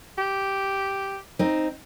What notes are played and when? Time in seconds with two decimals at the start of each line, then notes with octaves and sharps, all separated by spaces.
0.18 G4
1.39 C4 D#4